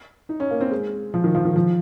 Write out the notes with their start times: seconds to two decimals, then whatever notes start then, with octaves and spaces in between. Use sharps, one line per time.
0.29 D#4
0.40 C#4
0.51 A#3
0.61 C4
0.71 G#3
1.14 F3
1.24 D#3
1.35 F3
1.45 D#3
1.56 F3